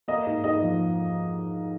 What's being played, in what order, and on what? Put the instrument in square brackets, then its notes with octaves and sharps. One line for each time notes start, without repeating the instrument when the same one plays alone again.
[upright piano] A#3 D#5
G#2
G#2 D#5
F3